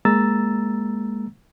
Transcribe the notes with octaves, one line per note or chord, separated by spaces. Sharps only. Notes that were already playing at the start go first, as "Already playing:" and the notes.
G#3 A#3 A#5 E6 A6